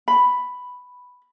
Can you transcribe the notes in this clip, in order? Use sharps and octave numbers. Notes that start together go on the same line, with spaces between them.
B5